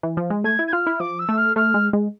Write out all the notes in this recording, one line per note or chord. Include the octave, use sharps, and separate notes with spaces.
E3
F3
G#3
A3 G#6
E4
G#6
F4 F6
E4
F3 D6
E6
A3
F6
A3 F6
G#3
G#3